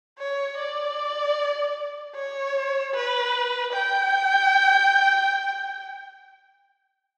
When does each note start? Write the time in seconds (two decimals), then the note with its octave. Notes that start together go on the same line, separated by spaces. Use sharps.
0.19 C#5
0.58 D5
2.15 C#5
2.94 B4
3.73 G5